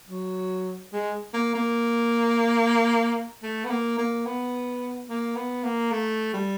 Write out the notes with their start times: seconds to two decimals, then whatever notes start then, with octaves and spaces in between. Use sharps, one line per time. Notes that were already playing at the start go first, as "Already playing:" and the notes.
0.09 F#3
0.93 G#3
1.33 A#3
1.55 A#3
3.42 A3
3.65 B3
3.70 A#3
3.98 A#3
4.26 B3
5.09 A#3
5.36 B3
5.64 A#3
5.92 A3
6.34 G3